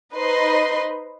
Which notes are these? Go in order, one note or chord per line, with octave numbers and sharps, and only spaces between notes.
D#4 B4 C5 D#5 C6